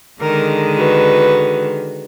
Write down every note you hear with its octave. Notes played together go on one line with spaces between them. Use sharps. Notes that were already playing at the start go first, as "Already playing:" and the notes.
D3 D#3 G#3 A#4
F#4 B4